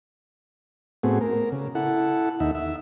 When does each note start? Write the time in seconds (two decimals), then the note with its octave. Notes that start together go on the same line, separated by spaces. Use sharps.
1.03 A2 A3 B3 C4 F#4 G#4
1.21 A#4
1.52 C#3
1.75 E4 A4 F#5
2.40 D#2 D#4 E5
2.55 E5